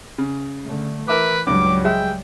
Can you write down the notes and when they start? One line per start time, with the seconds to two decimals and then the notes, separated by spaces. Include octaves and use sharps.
0.18 C#3
0.66 D3 A3
1.08 E3 A#4 B4 E5 D6
1.47 C#2 G2 F#3 G3 D6
1.84 G#3 E5 G5